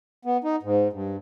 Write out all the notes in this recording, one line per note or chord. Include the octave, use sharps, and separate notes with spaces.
B3
D#4
G#2
G2